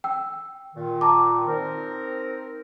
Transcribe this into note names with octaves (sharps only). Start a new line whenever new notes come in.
G5 E6
A#2 D#3
A5 A#5 D6
C4 D#4 A#4